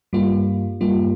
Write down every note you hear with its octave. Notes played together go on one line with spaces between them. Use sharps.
G2 G3 A#3 F4
G2 G3 A#3 F4